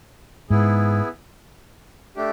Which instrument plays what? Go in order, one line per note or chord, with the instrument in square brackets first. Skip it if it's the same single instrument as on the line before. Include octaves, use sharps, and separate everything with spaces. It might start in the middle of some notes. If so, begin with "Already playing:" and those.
[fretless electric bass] G#2 [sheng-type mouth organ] B3 E4 G#4
[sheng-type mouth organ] A3 D4 G4